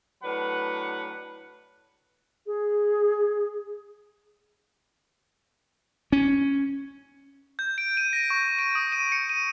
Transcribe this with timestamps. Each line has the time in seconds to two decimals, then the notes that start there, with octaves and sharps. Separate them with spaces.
0.24 A2 F#3 D4 B4 F#5 B5
2.46 G#4
6.12 C#4
7.59 G6
7.78 D7
7.97 D#7
8.13 A#6
8.30 C#6
8.59 D7
8.75 D#6
8.92 D#7
9.12 C#7
9.29 D#7